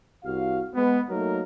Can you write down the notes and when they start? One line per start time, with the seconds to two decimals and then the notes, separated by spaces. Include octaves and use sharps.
0.24 C2 F#4 F5
0.74 G#3 B3
1.10 F#3 A3 A#3 D#4 A#4